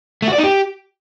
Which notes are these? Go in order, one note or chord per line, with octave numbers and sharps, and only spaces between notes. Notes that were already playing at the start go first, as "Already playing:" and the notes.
A3
F#4
D5
D#4
G4